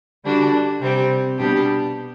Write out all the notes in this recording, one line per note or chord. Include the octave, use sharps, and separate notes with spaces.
D3 G3 D4 F#4
C3 G3 C4
B2 G3 D4 G4